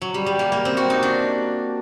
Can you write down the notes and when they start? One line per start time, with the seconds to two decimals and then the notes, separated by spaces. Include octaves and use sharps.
0.02 F#3
0.14 G3
0.26 G3
0.39 A#3
0.52 A#3
0.65 C4
0.77 F#4
0.90 D#4
1.03 D4